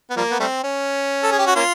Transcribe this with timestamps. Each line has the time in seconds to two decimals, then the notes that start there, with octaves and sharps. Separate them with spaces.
0.10 B3
0.16 F3 G3 A#3
0.30 B3
0.40 G3 A3 C4
0.64 C#4
1.23 A4
1.32 G#4
1.39 G4
1.47 F#4
1.56 A#3 C#4 F4